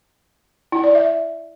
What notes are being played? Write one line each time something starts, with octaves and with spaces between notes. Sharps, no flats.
E4
D5
E5